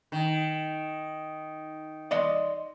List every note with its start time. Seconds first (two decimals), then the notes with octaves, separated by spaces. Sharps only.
0.12 D#3
2.11 D5 D#5 C6